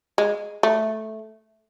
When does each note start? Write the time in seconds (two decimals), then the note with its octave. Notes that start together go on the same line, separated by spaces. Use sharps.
0.18 G#3
0.63 A3